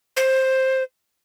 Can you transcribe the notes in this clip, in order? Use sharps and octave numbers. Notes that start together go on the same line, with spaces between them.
C5